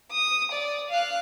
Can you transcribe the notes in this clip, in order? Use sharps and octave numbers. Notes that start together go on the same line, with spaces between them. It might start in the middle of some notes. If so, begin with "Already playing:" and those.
D#6
D5
F5 F#6